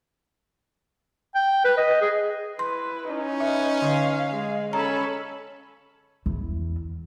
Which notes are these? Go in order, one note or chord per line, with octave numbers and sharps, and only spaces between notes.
G5
B4
D#5
G#4
E4 B4 C6
C#4 D#4
B4 E5
D3 F5
G#3
C#4 A4 A#5 B5
E2